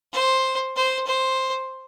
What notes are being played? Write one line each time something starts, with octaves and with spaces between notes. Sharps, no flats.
C5
C5
C5